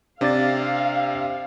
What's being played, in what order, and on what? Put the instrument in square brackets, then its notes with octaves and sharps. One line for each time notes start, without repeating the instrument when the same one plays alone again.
[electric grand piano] C3 [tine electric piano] D4 D5 A6 [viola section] F5